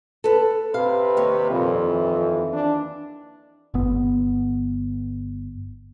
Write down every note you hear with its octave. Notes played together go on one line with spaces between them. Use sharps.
A4 B4
C3 B4 F5
D#2 C#5
F2 A#2
E3
D4
G1 B3